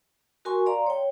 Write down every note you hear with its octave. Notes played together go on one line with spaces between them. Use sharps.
F#4 A#4 G#5 C6 C#6
D5 F5 A#5 C6
C#5 G5